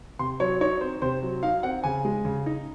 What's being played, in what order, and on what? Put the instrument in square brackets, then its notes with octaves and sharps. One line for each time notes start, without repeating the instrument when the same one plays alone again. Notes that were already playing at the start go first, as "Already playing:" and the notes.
[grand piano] C3 C6
F#3 C#5
D#4 C#5
C4 C5
C3 C5
F#3
D#4 F5
C4 F#5
C#3 G#5
G#3
C#3
D#4